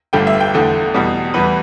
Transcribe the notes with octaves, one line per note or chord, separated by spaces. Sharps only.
G1 G2 D3 A3 G5
E5
G5
E2 D3 A3
E2 B2 G3
E2 E3 G3 B4